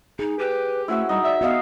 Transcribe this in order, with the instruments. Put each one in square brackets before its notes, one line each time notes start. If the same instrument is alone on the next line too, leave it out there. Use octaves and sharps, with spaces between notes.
[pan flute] D#4 [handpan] G#4
[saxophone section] G4 [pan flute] B4
[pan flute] A3 [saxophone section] C4 C#4 [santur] E4 F#4 E5
[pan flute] G3 [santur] D#4
[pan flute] D5 [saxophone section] E5
[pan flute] B3 [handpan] F#4 D#5 F5